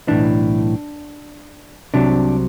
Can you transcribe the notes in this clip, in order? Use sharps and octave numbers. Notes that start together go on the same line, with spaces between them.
B1 A2 E3 D4
C2 C3 F#3 D4